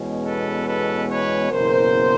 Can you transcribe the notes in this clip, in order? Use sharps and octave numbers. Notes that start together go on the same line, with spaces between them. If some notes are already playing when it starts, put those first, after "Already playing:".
Already playing: E2 B2 G#3 C#4
A4 B4
A4 B4
B4 C#5
F#1 E2 B2 A#4 C5